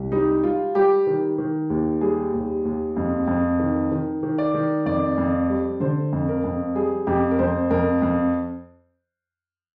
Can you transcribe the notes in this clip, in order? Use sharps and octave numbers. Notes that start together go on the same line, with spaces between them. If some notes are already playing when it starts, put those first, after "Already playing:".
Already playing: C2
G3 D#4
G3 F4
G3 G4
D#3
D#3
D#2
G3 G#4
D#2
D#2
F2
F2
D#3
D#3
D#3
D5
D#3
F2 D5
F2
G3
D3 C5
F2
A#4
F2
G3 G#4
F2 G4
A#4
F2 C5
F2 A#4
F2